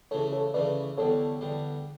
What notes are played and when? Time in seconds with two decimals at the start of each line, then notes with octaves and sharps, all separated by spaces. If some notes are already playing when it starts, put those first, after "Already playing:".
0.11 C#3 E3 A3 A4 C#5
0.32 A4 C#5
0.54 C#3 E3 A3 B4 D5
0.98 E2 D3 G3 A4 C#5
1.41 E2 D3 G3